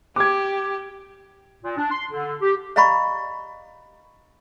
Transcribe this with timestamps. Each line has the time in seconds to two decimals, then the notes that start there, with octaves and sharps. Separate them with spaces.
0.16 G4 D6 G#6
1.63 A#2
1.78 D4
1.91 C6
2.11 D3
2.41 G4
2.76 D5 D#5 F5 A#5 B5 C#6